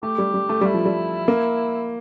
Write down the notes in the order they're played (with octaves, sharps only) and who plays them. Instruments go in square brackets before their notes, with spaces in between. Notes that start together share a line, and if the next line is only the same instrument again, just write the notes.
[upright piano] A3 [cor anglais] G4
[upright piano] G3
G3
A3
[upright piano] G3 [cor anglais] E4
[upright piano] F3
G3
A#3